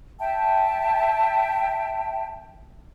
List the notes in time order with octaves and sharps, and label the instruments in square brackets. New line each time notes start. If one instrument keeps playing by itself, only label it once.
[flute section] E5 G5 A5